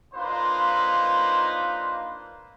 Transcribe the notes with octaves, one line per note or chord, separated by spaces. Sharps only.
A#3 D4 D#4 F4 B4 C5